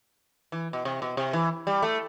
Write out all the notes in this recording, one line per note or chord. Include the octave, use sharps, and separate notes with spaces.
E3
B2
C3
B2
C3
E3
G3
A3